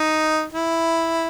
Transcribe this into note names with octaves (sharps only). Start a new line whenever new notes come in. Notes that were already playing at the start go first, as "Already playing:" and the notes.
Already playing: D#4
E4